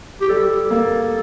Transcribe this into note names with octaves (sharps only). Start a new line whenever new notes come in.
G4
G3 A4
A#3